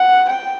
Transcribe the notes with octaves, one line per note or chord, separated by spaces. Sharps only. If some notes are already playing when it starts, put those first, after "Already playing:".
Already playing: F#5
G5